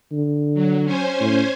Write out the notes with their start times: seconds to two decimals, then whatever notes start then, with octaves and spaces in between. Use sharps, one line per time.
0.12 D3
0.54 F#3
0.84 C#4 C5 G#5
1.21 A2